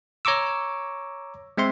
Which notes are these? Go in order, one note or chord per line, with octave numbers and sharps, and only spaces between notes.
C#5 A#5 C#6 D6 E6
G#3 C4 E5 C6